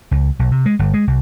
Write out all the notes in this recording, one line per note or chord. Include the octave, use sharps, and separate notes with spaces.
C#2
B1
C3
G#3
G1
G#3
C2